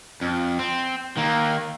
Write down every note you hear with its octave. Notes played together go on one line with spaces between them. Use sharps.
F2
C4
D#3 A#3